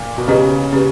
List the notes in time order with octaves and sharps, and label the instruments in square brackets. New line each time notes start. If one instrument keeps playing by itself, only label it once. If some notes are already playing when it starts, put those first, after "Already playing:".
Already playing: [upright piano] A#2
B2
[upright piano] C#3 [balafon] C#4 G4 B4 D#5
[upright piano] C#3 [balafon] C#4 G4 B4